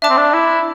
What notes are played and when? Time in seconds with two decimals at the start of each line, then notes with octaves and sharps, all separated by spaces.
0.02 D4 E5 A5 D6
0.09 C4
0.17 D4
0.34 E4